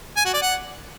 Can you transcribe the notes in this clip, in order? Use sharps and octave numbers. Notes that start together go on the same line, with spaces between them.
G#5
F#4
D5
F#5